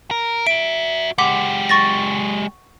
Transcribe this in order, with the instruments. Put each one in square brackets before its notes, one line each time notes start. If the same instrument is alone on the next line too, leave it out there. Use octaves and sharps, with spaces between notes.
[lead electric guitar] A#4
[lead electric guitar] F#4 E5 [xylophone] D7
[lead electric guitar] G#3 G4 [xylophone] F#5 D6 B6
[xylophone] C#6 A6 A#6